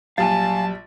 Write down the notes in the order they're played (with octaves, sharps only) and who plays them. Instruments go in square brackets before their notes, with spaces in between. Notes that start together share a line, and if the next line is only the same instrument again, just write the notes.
[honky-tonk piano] A#1 G3 A6 [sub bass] F#3 [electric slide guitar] F5 G#5 [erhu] A5